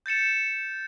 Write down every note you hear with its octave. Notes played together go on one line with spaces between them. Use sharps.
G6 A6 C#7 E7